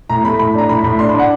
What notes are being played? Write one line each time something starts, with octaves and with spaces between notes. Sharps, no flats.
A2 A#5
A3 B5
A2 B5
D4 A#5
A2 B5
A2 B5
D4 C6
B5
D4 F#5